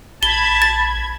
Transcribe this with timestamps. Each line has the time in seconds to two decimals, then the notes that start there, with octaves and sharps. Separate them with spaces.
0.23 A#1 A5 B5 G#6 G7
0.62 A6